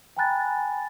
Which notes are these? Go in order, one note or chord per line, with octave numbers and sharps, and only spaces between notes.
G5 G#5 A#5 B5 F#6 A6